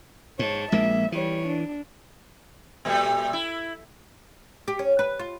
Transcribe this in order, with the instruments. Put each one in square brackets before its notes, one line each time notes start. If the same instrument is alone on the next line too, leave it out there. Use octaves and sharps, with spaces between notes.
[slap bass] G#2 [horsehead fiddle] C#5 A5
[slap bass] A#1 G#3 A#3 [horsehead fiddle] E5
[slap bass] E3 [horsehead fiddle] G3 C#5
[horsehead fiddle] D4
[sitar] A#2 G3 A3
E4
[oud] G4
C#4
B4
F4